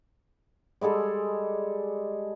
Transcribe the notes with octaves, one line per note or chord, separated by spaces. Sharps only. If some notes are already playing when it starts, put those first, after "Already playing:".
G3 G#3 G#4 A4